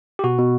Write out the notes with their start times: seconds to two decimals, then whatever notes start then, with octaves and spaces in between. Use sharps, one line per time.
0.19 G4
0.24 B2 F#4
0.39 B2